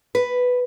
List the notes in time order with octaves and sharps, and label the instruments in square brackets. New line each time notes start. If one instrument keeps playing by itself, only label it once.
[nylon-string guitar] B4